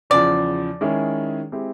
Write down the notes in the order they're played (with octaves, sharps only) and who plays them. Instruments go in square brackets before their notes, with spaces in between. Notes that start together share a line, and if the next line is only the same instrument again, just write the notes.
[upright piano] E2 C#3 F3 [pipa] D5
[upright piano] D#3 G#3 C#4 E4 G#4
G#3 C4 E4 G4